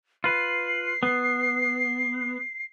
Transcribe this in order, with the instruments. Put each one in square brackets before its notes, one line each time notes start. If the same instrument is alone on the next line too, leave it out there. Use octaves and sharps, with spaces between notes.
[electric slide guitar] F4 B4 [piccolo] C7
[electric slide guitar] B3